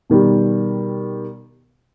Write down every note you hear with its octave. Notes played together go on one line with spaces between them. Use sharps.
B2 D#3 G3